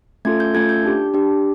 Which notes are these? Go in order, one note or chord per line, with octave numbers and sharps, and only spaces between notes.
A3 C#4 F4 A4 G#6
G6
A3 C#4 F4 A4 G#6
G6
D4 G4
D4 G4